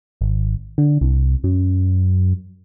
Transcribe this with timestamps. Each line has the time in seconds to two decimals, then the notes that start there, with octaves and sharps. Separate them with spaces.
0.21 G#1
0.78 D3
1.01 C2
1.44 F#2